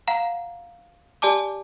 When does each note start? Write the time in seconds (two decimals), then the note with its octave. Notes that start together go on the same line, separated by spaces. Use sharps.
0.08 F5 F#5 A#5
1.22 G4 D5 G#5 A5 D6